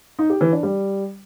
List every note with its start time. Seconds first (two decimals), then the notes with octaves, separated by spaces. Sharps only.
0.19 D#4
0.30 G4
0.41 E3
0.52 D4
0.63 G3